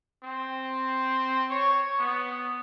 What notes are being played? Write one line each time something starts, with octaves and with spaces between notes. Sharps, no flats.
C4
C#5
B3